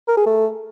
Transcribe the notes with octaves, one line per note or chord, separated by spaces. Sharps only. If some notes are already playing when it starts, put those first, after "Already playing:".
A#4
G#4
A3